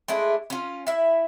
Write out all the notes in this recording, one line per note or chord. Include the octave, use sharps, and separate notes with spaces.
G#3 A3 D4 E4
C#4 F4
E4 E5